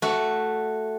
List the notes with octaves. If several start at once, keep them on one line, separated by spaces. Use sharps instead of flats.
A3 F#4